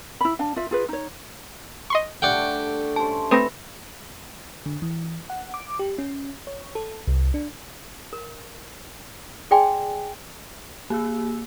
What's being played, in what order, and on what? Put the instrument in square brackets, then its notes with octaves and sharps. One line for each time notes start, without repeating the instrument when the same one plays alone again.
[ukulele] E4 B5
D4 F5
F4 E5
F4 G#4 B4
D#4 C#5
[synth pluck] D#5 C6 C#6
[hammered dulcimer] D3 G3 A3 [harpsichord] D5 F#5 G5
[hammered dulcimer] G3 C#4 C5 [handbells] A5
[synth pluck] A3 C4 D#6 [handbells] B4 B5 A#6
[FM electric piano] D3
E3
F#5
D6
G4
C#4
C#5
A4
C2
D4
[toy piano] A#4
G#4 D5 G5 G#5 C6
[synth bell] A#3 G#4 E6